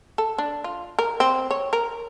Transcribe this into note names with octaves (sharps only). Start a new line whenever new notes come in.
A4
D4
F4
A#4
C4
C#5
A#4